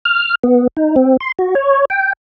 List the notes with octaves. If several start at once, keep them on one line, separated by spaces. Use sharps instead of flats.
F6
B3
D#4
C4
C6
F#4
C#5
G5